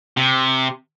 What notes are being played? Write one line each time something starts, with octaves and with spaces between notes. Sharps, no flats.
C3